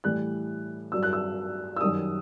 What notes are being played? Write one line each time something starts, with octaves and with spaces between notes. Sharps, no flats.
A2 E3 G3 F#6
G2 F#3 E6
F#6
E6
E6
F#2 D#3 G3 D#6